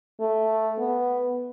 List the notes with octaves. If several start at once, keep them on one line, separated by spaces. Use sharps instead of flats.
A3
B3